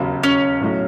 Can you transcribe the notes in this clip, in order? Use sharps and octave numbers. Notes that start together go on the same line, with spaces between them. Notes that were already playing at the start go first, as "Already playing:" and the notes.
Already playing: E1 D#2 C#3 F#3
C#4
B1 A2 F#3